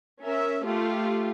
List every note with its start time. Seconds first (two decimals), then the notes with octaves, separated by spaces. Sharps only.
0.22 C#4 A#4 E5
0.64 A3 F4 G4